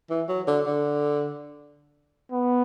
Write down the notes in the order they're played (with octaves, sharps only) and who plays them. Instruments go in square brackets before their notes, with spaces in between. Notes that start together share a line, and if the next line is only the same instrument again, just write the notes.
[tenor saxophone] E3
F#3
D3
D3
[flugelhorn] B3